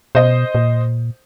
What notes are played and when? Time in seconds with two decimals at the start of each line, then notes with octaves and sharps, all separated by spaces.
0.15 B2 C5 D#5
0.55 A#2